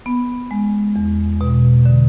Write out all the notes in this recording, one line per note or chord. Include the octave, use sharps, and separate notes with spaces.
B3
G#3
E2
B2
D3